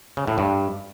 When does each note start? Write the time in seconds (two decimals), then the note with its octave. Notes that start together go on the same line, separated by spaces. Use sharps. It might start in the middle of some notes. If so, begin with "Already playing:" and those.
0.17 C#3
0.27 A2
0.38 G2